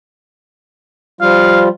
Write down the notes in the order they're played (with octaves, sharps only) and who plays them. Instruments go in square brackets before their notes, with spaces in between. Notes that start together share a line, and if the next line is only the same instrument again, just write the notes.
[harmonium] F3 G3 F4 [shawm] F5